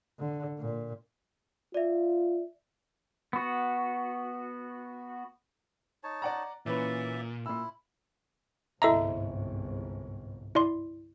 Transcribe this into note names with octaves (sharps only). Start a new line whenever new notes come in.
D3
A#2
F4 D5 E5
B3 F#4
D#4 C#5 A5
D5 F#5 A#5
A#2 E3 C#4 B4 D5 E5
A#2 E4 E6
G1 C2 G#2 E4 A4 D#5 E5 A#5
E4 D5 C6